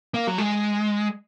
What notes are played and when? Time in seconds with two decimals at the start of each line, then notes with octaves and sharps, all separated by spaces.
0.14 A#3
0.27 F#3
0.38 G#3